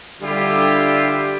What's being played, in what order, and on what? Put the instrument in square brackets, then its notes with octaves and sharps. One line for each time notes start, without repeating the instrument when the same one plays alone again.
[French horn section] D3 G3 [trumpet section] E4 F4 G4